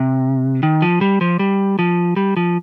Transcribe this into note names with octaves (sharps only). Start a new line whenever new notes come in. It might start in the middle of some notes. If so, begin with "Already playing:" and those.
Already playing: C3
D#3
F3
G3
F3
G3
F3
G3
F3